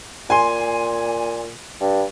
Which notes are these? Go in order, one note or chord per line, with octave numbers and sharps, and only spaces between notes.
A#2 G#5 C6
G2